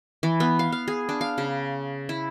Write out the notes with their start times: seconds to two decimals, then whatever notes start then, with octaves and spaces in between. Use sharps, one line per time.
0.23 E3
0.40 B3
0.59 F5
0.72 F5
0.88 G#4
1.09 D4
1.21 F5
1.38 C#3
2.09 E4